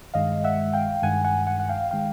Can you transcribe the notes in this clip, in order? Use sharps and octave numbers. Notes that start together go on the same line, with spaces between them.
G2 D#3 G#3 D#5 F5
E5 F#5
F5 G5
G2 D#3 G#3 F#5 G#5
F#5 G#5
F#5 G#5
F#5
F5 G5
D#3 G#3 F5 G5